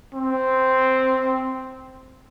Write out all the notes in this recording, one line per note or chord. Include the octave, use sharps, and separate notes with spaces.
C4